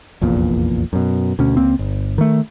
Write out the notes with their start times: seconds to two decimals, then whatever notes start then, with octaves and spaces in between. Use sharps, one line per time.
0.21 F1 A#1 E2 A#2
0.93 F#2 B2
1.39 D2 B2 C#4
1.57 C#2 A#3 C4
1.79 G1
2.18 D#3 A3